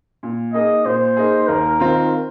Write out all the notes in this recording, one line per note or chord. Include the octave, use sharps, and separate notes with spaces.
A#2
A#3 D#4 G#4 D#5
A#2 C5
A#3 D#4 G#4
D#2 A#4
D#3 C4 F4